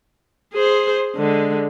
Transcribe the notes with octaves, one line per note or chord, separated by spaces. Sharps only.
G#4 C5
D3 G#3